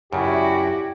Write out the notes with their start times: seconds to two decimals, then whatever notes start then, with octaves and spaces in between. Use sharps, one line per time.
0.13 F#2 C#3 E4 F#4 G4 D5